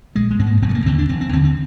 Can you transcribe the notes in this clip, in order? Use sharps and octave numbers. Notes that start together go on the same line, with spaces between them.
A#1 G#3
G#3
G#2 C4
A#3
F1 C4
G#3
A#3
D#2 D3 C4
D4
F1 C4
C4
D#2 D3 C4
C4